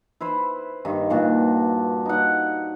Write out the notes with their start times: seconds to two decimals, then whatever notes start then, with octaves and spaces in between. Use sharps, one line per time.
0.21 E4 B4 C5
0.85 G2 D#3
1.10 G2 A#2 D4 F#4
2.06 D#4 F#5